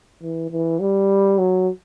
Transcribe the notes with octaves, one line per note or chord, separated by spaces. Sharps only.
E3
E3
G3
F#3